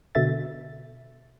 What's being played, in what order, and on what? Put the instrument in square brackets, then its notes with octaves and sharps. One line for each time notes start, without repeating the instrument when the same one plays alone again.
[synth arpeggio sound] B2 D3 E5 A6